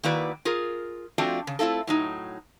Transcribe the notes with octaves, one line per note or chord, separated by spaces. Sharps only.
D#3 A#3 E4 F#4 B4 D5
F4 G#4 A#4
F3 A3 C4 D4 F4 F#4
C#3
A3 C4 E4 F4 A4
A2 F#3 D#4